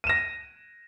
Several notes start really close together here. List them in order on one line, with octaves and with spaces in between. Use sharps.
D#7 E7 A#6